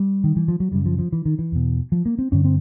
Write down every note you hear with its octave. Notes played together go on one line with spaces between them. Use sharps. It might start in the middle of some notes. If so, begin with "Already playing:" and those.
Already playing: G3
D#3
E3
F3
F#3
F#2 C#3 G3
F3
F3
E3
D#3
E3
E2 B2
F3
A#3
C4
G2 D3 C#4
C4